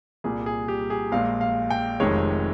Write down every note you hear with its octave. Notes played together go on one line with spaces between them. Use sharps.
C2 A#2 G3 G#4
G#4
G4
G#4
A#1 A#2 G#3 F5
F5
G5
F1 F2 C3 D#3 G#3 C#5